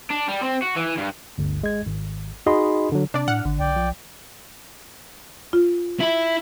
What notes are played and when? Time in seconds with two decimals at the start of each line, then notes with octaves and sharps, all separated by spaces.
0.11 D4
0.28 G3
0.43 C4
0.62 F#4
0.76 E3
0.97 G2
1.38 G1 D2
1.61 G#1 G#3 G#6
1.86 G#1
2.46 D#4 F#4 G#4 D#5 B5 C6
2.92 D3 F#3
3.14 C3 D4 D5
3.28 A2 F#5 F6
3.45 G#1 D3
3.60 B1 D5 G5
3.76 F3
5.53 F4
6.00 E4